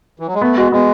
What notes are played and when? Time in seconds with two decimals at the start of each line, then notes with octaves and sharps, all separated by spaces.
0.19 E3
0.27 F#3
0.34 G#3
0.41 A3 B3
0.57 G#3 F#4
0.72 G#3 B3